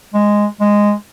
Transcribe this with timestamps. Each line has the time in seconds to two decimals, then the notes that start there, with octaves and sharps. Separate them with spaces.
0.14 G#3
0.60 G#3